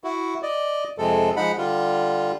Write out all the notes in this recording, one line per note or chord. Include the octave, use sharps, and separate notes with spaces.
E4 F#4
D5 D#5
F2 C3 G#3 A4
F3 G#3 D#4 F#5 B5
D3 G3 F4